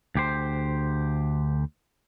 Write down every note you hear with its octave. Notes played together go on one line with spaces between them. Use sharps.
D2 G4 C5